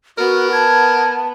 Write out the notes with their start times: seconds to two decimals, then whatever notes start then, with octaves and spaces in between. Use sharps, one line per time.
0.18 B3 F#4 A#4
0.53 A5 G#6